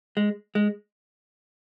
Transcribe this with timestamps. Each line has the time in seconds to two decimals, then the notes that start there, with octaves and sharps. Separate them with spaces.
0.17 G#3
0.55 G#3